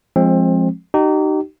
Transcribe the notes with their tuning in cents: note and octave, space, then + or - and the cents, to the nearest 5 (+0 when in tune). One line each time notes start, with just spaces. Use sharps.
F3 +0 G#3 +5 C4 +25
D#4 -20 G4 -35